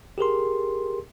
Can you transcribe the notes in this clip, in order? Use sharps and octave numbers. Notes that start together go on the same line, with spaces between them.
G4 G#4 A#4 C6